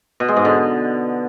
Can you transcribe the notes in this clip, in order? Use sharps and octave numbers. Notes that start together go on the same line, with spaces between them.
B2
G#3
G#2
D3